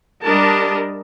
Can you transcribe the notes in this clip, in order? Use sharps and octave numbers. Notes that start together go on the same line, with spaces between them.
G3 D4 A#4 D#5 A5